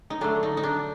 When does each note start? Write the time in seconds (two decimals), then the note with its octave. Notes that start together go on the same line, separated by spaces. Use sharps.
0.10 D#4
0.21 D3 F#3 A3 D4
0.43 D#4
0.57 D#4
0.63 D4